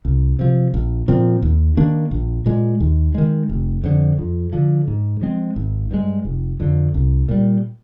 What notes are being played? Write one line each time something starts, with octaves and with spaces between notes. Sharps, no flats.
C2
C3 F3
A#1
A#2 F3 C4
D#2
D#3 A#3 D4
A#1
A#2 G#3
D#2
D#3 G#3
F1
F2 D3
F2
D3 F3
G#2
F3 G#3 C4
G#1
G2 D3 G#3
F1
F2 D3 F3
C2
A#2 G3